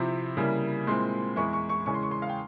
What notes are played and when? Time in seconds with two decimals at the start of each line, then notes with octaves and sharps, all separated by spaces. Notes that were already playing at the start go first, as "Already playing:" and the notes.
Already playing: C3 F3 C4 E4
0.37 C#3 G3 A#3 E4
0.87 A#2 G#3 C4 E4 C6
1.36 E2 E3 G#3 E4 C#6
1.53 C#6
1.69 C#6
1.86 C#3 E3 G#3 C#4 C#6
1.94 C6
2.03 C#6
2.11 C6
2.22 F5
2.29 G5